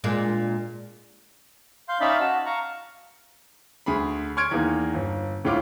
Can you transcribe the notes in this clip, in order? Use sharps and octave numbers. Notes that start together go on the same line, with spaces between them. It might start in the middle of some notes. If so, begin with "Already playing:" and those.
A#2 G#3 D4
F5 C6 G6
C#4 D#4 D5 E5 F5 B5
F#4 A5
F5 A#5 C#6
D2 G#4 B5
C6 C#6 F6 G#6 D7
E2 D#3 A#3
G1
D2 A2 F4 D6 F6